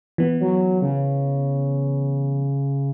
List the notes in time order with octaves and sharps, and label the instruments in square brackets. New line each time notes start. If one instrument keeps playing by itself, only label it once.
[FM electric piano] E3 B3
[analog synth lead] F#3
C#3